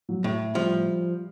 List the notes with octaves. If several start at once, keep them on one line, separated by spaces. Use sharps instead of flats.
F#3
A2
F3 G3